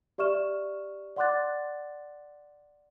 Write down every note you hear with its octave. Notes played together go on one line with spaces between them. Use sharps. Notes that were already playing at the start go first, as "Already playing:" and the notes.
G4 D5 E5 C#6 F6 E7
D5 F#5 C6 D6 F#6 A6